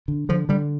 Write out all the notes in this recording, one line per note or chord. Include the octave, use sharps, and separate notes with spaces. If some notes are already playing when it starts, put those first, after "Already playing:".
D3
D3 F3
D3 G3